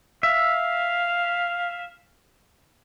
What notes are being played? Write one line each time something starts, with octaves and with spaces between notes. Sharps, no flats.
E5 F5